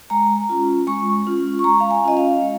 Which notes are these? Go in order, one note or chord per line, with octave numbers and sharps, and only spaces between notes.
G#3 A#5
C#4 F4
G#3 C#6
C#4 F4
C#6
G#3 A#5
F5
G#5
C#4 F4 D#5
F5
G#3